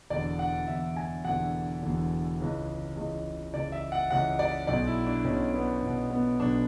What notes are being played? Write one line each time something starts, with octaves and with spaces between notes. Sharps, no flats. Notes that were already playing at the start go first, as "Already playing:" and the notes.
E1 E2 D3 D5
F#5
E1 E2 D3 E5
G#5
E1 E2 D3 F#5
E1 E2 D3
C#2 C#3 E3
C#2 C#3 E3
C#2 C#3 E3 D5
E5
F#5
C#2 C#3 E3 F#5
D5
B1 B2 D5
E4
D4
B1 B2 C#4
B3
B1 B2
B3
B1 B2 D4